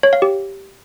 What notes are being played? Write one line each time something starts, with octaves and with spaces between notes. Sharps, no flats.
C#5
F5
G4